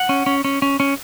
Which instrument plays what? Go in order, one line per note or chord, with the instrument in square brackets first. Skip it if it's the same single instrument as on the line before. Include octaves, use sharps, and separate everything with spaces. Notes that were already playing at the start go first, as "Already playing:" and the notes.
Already playing: [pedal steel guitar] F#5
C#4
C#4
C#4
C#4
C#4